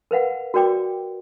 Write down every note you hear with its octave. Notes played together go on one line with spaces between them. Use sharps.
A#4 B4 F5 F#5
F#4 A#4 D5 G5 D6